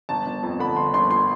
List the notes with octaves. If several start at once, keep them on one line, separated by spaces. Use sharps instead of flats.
G1 A5
G1
F2
D3 B5
G1 C6
G1 C6
C6